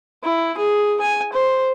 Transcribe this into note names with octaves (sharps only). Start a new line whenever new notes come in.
E4
G#4
G#5
C5